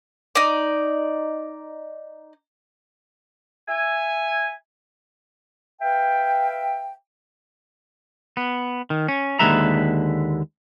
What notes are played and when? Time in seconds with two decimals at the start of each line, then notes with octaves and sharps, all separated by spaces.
0.35 D#4 D5
3.69 E5 G#5
5.82 B4 E5 F5 G5
8.37 B3
8.90 D#3
9.08 C#4
9.39 D#2 D3 G#3 B4 E5 A#5